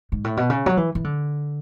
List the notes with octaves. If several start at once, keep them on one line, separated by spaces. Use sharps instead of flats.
G#2
A2
B2
C#3
F#3
E3
E3
D3